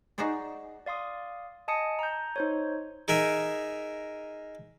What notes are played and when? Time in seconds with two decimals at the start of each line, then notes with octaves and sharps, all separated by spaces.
0.18 D#4 F#4 G#4 C5 D5
0.86 D5 F5 C6 D#6
1.68 D#5 G#5 A5 D#6 C#7
1.99 A#5 G6
2.36 D#4 C5 C#5
3.08 D#4 G#4 A#4 E5